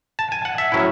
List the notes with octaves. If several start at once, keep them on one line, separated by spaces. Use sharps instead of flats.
A5
G#5
F#5
E5
A2 F#3 C#4 E4